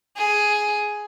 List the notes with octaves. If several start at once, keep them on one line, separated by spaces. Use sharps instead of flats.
G#4